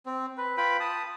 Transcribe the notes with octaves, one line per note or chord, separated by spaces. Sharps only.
C4
B4
F4 B4 G5 B5
A5 D#6